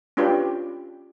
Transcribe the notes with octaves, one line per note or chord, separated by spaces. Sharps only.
C#4 D4 F4 G4 B4